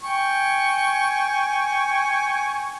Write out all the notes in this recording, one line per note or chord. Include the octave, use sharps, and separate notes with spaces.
G5 G#5 C#6